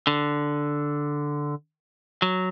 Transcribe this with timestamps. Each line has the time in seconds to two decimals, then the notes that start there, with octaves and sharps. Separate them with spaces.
0.07 D3
2.22 F#3